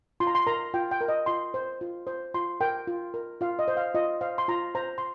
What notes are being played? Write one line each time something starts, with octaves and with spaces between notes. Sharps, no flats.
F4 C6
A#5
C6
A#4 A#5
F4 G5
G5
A#4
D#5
F4 C6
C5
F4
C5
F4 C6
A#4 G5
F4
A#4
F4 F5
D#5
C5
F5
F4 D#5
C5 F5
C6
F4 A#5
C5 A#5
C6